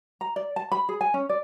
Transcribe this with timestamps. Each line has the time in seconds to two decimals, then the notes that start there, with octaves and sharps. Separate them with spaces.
0.21 A#5
0.36 D5
0.56 A5
0.72 B5
0.89 G#4
1.01 G#5
1.14 C#4
1.29 D5